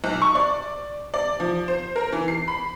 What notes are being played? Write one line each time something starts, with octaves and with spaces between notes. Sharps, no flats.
B1
C#6
D5
D5
F3
C5
A#4
E3
C7
B5